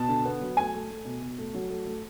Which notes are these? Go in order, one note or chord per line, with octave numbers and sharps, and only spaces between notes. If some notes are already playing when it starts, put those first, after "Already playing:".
Already playing: B2 A5
D3
B3
F#3
A3 G#5
A3
A3
B2
B2
A3
F#3
A3
A3